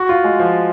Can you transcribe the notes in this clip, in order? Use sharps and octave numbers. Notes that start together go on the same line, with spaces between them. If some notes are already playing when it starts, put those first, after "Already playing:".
Already playing: F#4
F4
G#3
F3